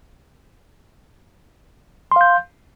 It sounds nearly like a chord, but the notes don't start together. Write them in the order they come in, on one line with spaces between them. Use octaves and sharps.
C6 F5 G6